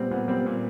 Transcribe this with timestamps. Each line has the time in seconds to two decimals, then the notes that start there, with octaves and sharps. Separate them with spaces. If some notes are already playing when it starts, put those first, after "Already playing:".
Already playing: A#2 G3 B3 C4
0.11 A#2 B3
0.28 G3 C4
0.46 A#2